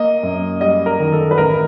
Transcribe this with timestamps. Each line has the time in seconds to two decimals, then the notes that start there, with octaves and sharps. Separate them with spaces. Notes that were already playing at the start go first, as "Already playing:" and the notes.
Already playing: A#3 D#5
0.23 F#2
0.61 G3 D#5
0.86 A#4
1.00 D#3
1.13 A4
1.31 B4
1.38 A1 A#4